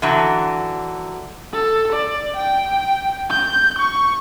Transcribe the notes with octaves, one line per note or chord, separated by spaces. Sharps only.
D3 E3 F#3
A4
D5
G5
G6
C#6